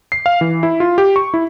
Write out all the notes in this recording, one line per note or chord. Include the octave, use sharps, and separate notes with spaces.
C7
F5
E3
E4
F4
G4
C#6
E4